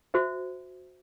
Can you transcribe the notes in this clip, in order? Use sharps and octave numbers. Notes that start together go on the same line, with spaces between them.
F#4 C5 E5